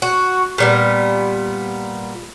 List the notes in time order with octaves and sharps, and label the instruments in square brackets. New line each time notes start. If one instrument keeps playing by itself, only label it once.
[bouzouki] F#4
A#2 G3 B3